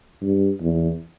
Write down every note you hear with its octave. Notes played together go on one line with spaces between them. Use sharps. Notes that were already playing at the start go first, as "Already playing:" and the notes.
G2
E2